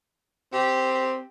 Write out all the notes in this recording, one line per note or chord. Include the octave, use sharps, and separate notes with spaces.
C4 G4